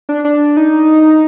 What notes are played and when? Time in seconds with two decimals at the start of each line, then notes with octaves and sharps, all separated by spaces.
0.09 D4
0.25 D4
0.57 D#4